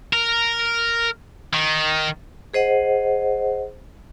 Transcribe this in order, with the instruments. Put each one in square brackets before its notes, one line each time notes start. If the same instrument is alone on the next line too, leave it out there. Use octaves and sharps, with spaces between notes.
[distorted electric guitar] A#4
D#3
[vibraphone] G#4 C5 D#5 F#5